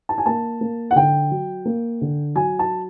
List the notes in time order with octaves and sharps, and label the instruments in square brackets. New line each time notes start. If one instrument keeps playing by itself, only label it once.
[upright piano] A5
G#5
A#3 A5
A#3
F#5
D3 G5
F#3
A#3
D3
F#3 G#5
A5